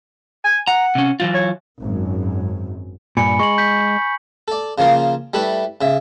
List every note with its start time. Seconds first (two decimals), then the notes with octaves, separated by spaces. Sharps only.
0.44 G#5
0.67 F#5 A#5
0.95 C3 C#4
1.20 E3 F#3 F4
1.34 C#5
1.80 G#1 F#2
3.17 G2 A#2 G#5 B5 C#7
3.39 G#3 C#6 F#7
3.58 G6 B6
4.48 A4 D5
4.78 C#3 F3 A#3 F4 A#4
5.34 G3 A3 E4 B4
5.81 C#3 E5